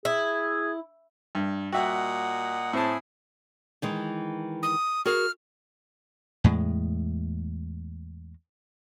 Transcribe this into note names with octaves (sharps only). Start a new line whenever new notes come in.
E4 G#4
G2 G3
A#2 F#4 D#5 E5 F#5 G5
A2 C4 E4 G#4 C5 A5
D#3 E3 G#3
D#6
F#4 G#4 A#4 F6
E2 A2 G#3